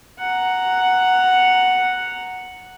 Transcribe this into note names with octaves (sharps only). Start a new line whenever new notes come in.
F#5 A#5